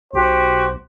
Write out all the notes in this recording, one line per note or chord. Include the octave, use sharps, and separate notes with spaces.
B1 F#4 G4 C5